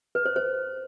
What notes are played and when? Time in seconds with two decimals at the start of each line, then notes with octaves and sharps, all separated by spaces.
0.15 B4
0.26 C5
0.36 C5